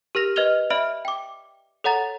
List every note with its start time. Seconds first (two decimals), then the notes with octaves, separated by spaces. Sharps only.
0.15 G4 A#4 F6 A#6 F7
0.36 B4 D#5 F6 G#6 F7 G7
0.70 D5 E5 B5 F6 D7 F#7
1.05 G5 D6
1.84 A4 C#5 F#5 A#5 A6 F7